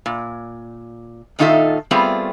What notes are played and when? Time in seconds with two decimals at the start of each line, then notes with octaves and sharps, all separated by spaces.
0.06 A#2
1.39 A#2 D#3 D#4 F4 A4 E5
1.91 G3 A3 B3 C4 F4 G#4